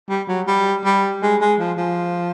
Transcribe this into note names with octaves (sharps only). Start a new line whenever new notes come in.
G3
F#3
G3
G3
G#3
G#3
F3
F3